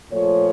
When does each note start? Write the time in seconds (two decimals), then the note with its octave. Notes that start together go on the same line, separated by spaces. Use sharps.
0.12 A#2 F3 A3 C#5